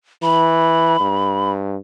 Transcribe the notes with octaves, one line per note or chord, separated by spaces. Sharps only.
E3 B5
G2